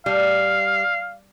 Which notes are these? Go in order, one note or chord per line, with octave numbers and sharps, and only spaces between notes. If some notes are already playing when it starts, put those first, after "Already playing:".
G3 F5